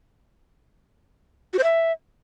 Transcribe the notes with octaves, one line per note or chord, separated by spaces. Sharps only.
F#4
C5
E5